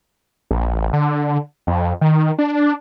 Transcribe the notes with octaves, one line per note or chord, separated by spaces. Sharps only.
A#1
A1
D3
F2
D#3
D4